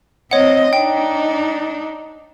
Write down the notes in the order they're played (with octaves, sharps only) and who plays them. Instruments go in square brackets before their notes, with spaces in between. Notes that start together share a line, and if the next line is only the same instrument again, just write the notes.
[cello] C4 D#5 [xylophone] C#5 F#5
[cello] D4 D#4 [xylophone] G5